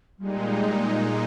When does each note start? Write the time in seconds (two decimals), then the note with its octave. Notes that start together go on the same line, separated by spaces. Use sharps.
0.19 A#2 G3 G#3 D#4
0.93 G3